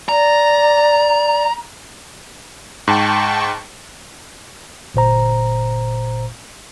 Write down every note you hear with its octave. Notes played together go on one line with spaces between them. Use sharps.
D5 A#5
G#2 G5 A5 C#6
G1 A#2 C5 A#5